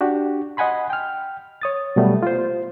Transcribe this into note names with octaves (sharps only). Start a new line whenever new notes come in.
D4 F#4 G4
D#5 F#5 G#5 B5 C6
G5 F6
C#5 D#6 A6
B2 F#3 G3 A3 B3
F4 C5